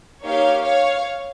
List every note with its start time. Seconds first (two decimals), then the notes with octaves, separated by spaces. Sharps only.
0.23 A#3 D#4 G4 C#5 F5
0.63 C#5 F5